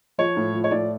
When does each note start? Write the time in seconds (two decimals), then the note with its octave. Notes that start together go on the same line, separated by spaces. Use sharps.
0.18 F3 C#5
0.36 A2
0.54 F3
0.64 C#5
0.71 A2 D5